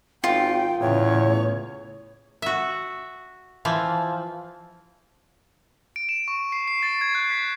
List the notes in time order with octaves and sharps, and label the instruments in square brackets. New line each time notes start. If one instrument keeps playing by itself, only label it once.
[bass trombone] G#1 [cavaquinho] F4 [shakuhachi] G5
[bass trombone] E2 [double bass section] A2 C#3 [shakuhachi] C#5
[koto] F#4 E5
E3 F3
[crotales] D7
E7
C#6
C7
C7
A6
G#6
F#6
B6